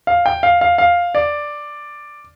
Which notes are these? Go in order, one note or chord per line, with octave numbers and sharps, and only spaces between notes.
F5
G5
F5
F5
F5
D5